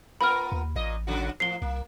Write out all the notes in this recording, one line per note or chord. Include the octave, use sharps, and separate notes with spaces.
B3 F4 A#4 B5 F6
D#2
A1 A#2 D#5
C#3 F#3 F#4
A2 F3 C7 G7
C2 A#3